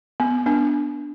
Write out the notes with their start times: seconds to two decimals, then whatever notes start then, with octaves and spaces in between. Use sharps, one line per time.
0.20 B3
0.46 B3 D4